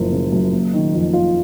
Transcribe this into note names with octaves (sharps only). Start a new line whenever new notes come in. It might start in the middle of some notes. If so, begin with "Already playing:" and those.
Already playing: F#1 F#2 C#3 F3
C#3
F#2
A#3
D#3
F2
F4